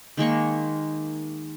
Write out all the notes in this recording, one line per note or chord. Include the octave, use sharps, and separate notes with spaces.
D#3 G#3 A#3 C#6